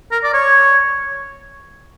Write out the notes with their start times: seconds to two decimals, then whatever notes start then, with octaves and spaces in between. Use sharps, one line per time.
0.11 A#4
0.24 D5
0.34 C#5